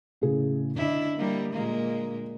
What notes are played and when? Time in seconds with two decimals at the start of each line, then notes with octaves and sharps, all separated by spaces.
0.21 A2 C#3 G#4
0.76 D3 D4 E4 D#5
1.18 G3 A#3
1.52 A#2 G#3 A#3